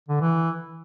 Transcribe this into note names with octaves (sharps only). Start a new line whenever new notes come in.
D3
E3